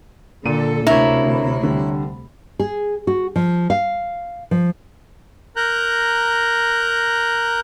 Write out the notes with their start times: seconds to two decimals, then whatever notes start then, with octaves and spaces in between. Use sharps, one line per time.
0.46 A#2 D3 A4 D#7
0.87 D2 C3 A#3 D4 E4 F#4 C#5 A#5
1.63 D3 G3
2.59 G#4
3.07 F#4
3.36 F3
3.70 F5
4.51 F3
5.56 A#4 A#5 F#6 G6